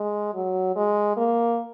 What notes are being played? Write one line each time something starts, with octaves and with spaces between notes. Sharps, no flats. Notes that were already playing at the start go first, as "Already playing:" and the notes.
Already playing: G#3
F#3
G#3
A#3